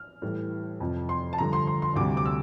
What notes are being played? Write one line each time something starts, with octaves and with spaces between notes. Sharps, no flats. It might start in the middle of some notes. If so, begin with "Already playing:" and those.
Already playing: F6
A2 E3 G3
F2 C3 F3
C6
A5
G2 D3 F3 A#5
C6
C6
C6
D2 C3 G3 D6
D6
E6